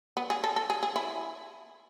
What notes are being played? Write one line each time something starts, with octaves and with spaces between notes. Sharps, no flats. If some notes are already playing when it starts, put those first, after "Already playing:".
B3
G#4
A4
A4
G#4
G#4
E4